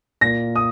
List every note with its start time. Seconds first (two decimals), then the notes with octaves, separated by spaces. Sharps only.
0.21 A#2 A#3 A#6
0.56 D#6